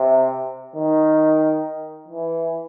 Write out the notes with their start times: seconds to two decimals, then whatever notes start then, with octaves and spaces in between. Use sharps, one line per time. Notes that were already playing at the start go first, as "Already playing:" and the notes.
Already playing: C3
0.76 D#3
2.08 E3